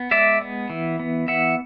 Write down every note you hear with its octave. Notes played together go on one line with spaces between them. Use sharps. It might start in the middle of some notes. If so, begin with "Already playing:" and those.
Already playing: B3
G#3 D5 E5
B3
E3
B3
E3 E5 F#5